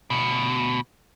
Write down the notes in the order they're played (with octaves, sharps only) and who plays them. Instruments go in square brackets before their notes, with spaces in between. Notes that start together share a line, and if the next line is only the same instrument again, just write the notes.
[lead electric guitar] D2 B2